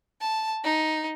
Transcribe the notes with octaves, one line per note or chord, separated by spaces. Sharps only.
A5
D#4